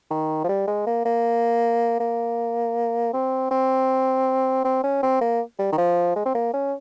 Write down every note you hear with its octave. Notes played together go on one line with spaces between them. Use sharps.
D#3
F3
G3
G#3
A#3
A#3
A#3
C4
C4
C4
C#4
C4
A#3
G3
D#3
F3
G#3
C4
A#3
C#4